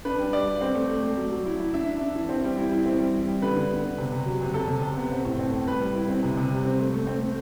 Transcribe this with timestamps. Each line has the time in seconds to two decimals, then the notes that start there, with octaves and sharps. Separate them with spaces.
0.05 D4 B4
0.19 G3
0.33 G3 D5
0.47 G3
0.61 C4
0.75 A3
0.89 A3
1.03 A3
1.17 F#3
1.32 F#3
1.46 E4
1.60 E4
1.74 D4 E5
1.88 D4
2.01 D4
2.16 E3
2.29 C4
2.44 G3
2.58 E4
2.72 E4
2.86 C4
3.00 G3
3.14 E3
3.28 G3
3.42 D3 B4
3.56 D3
3.70 B3
3.84 B3
3.98 C3
4.12 C3
4.26 F#3
4.41 C3
4.54 C3 A4
4.68 C3
4.82 C3
4.97 B3
5.10 C4
5.25 A2
5.39 C4
5.53 A2
5.67 G3 B4
5.81 G3
5.95 E4
6.09 C4
6.23 C3
6.37 C3
6.51 G3
6.65 C4
6.80 A3
6.94 A3
7.07 C4
7.22 A3